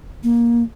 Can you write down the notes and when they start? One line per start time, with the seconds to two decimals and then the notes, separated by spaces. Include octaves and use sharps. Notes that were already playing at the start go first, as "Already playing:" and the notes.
0.24 A#3